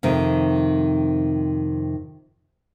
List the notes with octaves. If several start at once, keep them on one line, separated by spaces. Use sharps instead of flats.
F2 C3 D#3